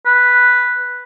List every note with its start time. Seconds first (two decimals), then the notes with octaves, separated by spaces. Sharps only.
0.06 B4